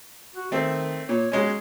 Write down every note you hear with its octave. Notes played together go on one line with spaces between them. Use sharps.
F#4
D#3 A3 C4
A#2 C#5
F#3 G#3 C#4 C#5